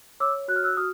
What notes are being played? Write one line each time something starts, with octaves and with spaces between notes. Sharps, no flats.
C#5 D6 E6
F#4 F#6
F6
E6 F#6
F#4 D#6 F6